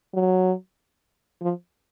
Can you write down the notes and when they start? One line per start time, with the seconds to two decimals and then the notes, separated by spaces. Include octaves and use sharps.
0.14 F#3
1.41 F3